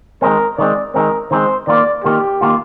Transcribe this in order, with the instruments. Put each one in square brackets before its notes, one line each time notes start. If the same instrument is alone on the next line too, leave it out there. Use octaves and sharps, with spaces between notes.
[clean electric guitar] D#3 G#3 C4 [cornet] A#4
[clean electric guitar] D#3 G#3 C4 [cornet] D5
[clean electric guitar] D#3 G#3 C4 [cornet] A#4
[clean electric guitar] D#3 G#3 C4 [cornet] C5
[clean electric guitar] D#3 A#3 F4 [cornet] D5
[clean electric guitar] D#3 A#3 F4 [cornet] G4
[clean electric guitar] D#3 A#3 F4